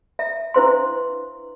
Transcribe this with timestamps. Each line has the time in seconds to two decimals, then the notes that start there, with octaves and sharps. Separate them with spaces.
0.19 E5
0.54 D4 E4 B4 C5 F5 C6